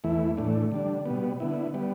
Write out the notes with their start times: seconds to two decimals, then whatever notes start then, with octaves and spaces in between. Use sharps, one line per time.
0.04 E2 E3 A3 E4
0.37 A2 E3 A3 D4
0.72 D3 G3 D4
1.06 B2 G3 B3
1.40 D3 B3 E4
1.74 G3 B3